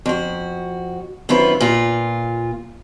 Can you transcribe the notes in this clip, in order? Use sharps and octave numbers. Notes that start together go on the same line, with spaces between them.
F2 F#4
F#2 D#3 C4 F4 B4
A#2 F4